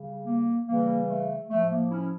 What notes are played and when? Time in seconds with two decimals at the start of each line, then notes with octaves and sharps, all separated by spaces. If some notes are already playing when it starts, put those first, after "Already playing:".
Already playing: C#3 G3
0.26 A#3
0.67 C#3 E3 G3 A#3
1.08 A3
1.49 A2 F3 A3
1.70 A#3
1.91 C#4 E4